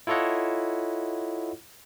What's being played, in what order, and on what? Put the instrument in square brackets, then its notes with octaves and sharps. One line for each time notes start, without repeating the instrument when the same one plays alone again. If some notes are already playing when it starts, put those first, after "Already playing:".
[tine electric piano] E4 F4 A4 C#5 D#5 F#5